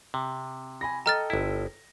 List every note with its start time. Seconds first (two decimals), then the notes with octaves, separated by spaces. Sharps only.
0.14 C3
0.81 G#5 B5 A#6
1.06 A4 D#5 G5 A#5 F6 A6
1.30 G1 E4